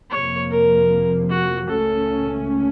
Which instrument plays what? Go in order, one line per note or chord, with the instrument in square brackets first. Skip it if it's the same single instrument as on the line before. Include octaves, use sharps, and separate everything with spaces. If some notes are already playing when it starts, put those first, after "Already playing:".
[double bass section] F2 C3 F3 A#3 [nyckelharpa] C#5
[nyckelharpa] A#4
F#4
[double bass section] C#2 C#3 A3 C#4 [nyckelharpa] A4